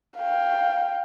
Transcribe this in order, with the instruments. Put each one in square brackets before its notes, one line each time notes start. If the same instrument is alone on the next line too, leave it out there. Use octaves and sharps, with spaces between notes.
[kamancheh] F5 G5